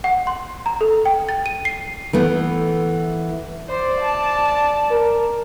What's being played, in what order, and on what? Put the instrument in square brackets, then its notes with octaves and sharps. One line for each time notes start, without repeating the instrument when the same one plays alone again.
[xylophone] F#5
C6
A#5
A4
G5
A6
D#7
C7
[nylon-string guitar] E3 A3 B3
[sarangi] C5 [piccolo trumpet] D5
[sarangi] A5
[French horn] A#4